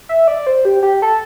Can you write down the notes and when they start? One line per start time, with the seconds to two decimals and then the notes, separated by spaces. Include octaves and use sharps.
0.09 E5
0.28 D5
0.47 C5
0.65 G4
0.83 G4
1.02 A4